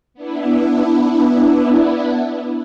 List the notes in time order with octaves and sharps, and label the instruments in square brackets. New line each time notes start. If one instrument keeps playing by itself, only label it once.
[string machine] B3 D4 E4